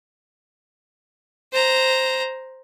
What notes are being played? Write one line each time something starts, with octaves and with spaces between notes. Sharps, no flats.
C5 A#5